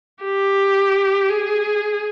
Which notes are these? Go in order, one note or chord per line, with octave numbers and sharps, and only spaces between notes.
G4
G#4